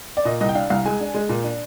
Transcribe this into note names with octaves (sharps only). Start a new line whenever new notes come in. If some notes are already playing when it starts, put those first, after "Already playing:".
D5
A#2 D#5
C2 D#5
G5
D4 F5
C2 F5
G#3 G#5
D4
G#3
A#2
D4